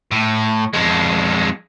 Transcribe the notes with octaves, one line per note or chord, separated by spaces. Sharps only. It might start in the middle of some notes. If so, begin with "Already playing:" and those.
A2
F2 G#3